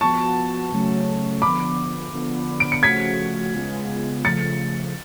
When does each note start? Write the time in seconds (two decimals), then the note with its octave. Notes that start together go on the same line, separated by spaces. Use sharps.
0.01 F3 B3 F#4 A5 C#6
0.72 C#3 F#3 A3 C#4
1.42 D3 F3 B3 B5 D6
2.13 D3 F3 B3 D4
2.60 D7
2.72 C#7
2.83 C#3 F3 A3 C#4 F#4 G#6 B6
3.54 C#3 G#3 B3 F4 G#4
4.24 C#3 F3 A3 A6 C#7